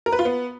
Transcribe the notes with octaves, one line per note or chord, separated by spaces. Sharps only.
A#4
B4
F4
B3